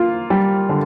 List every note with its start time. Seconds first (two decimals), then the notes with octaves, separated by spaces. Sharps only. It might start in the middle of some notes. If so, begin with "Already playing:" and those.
Already playing: A#3 F4
0.30 G3
0.69 D3